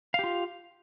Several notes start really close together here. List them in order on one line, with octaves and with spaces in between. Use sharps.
F5 G4 F4